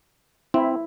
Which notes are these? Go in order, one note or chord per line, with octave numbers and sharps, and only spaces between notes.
C4 E4